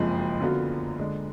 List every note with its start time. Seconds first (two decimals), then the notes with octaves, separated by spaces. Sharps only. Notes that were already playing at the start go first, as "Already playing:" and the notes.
Already playing: F#1 F2 F3 G#3
0.40 F#2 D3 F#3 B3 F4
0.99 D3 G#3 D4